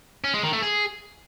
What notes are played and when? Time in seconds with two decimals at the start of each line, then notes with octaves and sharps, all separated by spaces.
0.24 C#4
0.34 G#3
0.43 D#3
0.53 A3
0.63 G#4